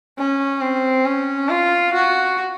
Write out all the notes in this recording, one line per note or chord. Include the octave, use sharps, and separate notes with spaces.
C#4
C4
C#4
F4
F#4